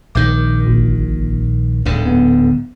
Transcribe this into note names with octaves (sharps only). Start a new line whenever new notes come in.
A#1 D#3 D6 G6
G1 A#2
D1 E2 G#2 D3
B3